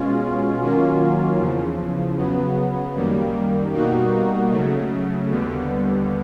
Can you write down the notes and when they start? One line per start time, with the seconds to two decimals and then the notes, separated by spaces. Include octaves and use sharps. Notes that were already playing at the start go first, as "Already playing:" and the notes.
Already playing: B2 G#3 C#4 F4
0.61 D#3 F#3 A#3 C#4 F4
1.39 E2 C#3 F3
2.18 C#3 F#3 B3
2.95 F#2 D#3 G3 A#3
3.73 B2 G3 A#3 D#4 F#4
4.51 C#3 F#3 A3
5.30 D#2 D3 G3 B3